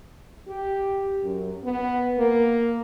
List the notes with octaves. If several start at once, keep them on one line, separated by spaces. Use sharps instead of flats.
G4
F#2
B3
A#3